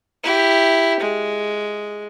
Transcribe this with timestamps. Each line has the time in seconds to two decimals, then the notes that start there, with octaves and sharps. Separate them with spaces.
0.23 E4 G4
1.00 G#3